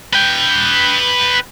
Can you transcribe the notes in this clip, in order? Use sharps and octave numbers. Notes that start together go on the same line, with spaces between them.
B4 G5